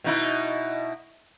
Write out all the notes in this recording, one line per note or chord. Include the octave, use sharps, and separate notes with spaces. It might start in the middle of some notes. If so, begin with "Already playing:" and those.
B2 D#4 E4